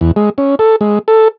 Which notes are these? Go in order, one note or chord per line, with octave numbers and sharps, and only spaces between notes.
E2
G#3
C#4
A4
G#3
A4